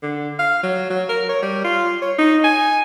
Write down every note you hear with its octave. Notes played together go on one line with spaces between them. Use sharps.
D3
F5
F#3
F#3
A#4
C#5
G3
F4
C#5
D#4
G#5